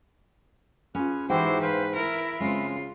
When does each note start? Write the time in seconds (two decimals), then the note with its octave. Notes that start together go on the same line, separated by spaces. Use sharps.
0.95 C#4 F4 G#4 B4
1.30 G#2 E3 E4 F#4 G4 C5 G5
1.62 B4 C5 F5
1.94 E4 A#4 E5 B5
2.40 C#3 G#3 C4 F4